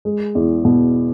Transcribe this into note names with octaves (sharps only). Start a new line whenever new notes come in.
G#3
E2
B2